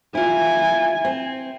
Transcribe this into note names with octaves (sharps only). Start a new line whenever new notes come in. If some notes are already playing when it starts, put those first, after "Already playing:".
E4 F4 G#5
C4